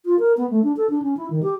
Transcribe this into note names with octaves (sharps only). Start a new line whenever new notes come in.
F4
A#4
B3
A3
D4
A4
D4
C#4
E4
D#3
G4